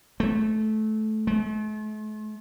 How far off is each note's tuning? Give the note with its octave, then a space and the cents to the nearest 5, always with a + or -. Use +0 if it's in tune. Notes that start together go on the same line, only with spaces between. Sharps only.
A3 -20
A3 -45